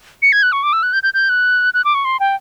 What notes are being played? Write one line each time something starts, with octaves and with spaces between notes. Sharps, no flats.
C#7
G#6
F#6
C#6
D6
E6
F#6
G6
G6
G6
F#6
F#6
D6
C#6
C6
G5